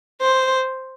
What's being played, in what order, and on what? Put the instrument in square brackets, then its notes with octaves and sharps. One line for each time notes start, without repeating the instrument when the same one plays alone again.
[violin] C5